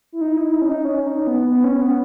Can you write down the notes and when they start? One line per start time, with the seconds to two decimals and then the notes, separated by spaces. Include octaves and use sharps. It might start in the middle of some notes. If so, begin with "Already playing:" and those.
0.12 E4
0.21 D#4
0.37 E4
0.53 D#4
0.62 C#4
0.69 D#4
0.85 C#4
1.07 D#4
1.27 B3
1.49 B3
1.64 C#4
1.81 B3